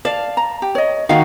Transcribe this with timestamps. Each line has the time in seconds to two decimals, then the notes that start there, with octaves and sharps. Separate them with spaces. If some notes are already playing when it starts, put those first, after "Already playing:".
0.05 D5 F5 A5
0.37 A#5
0.62 G4
0.75 C#5 D#5
1.09 D#3 F#4 F5